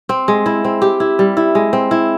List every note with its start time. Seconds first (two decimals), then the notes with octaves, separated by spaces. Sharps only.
0.09 C4
0.28 G#3
0.46 E4
0.64 C4
0.82 G4
1.00 E4
1.19 G3
1.37 E4
1.55 G#3
1.73 C4
1.91 E4